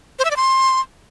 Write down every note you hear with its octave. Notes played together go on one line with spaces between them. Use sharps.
C5
E5
D5
C6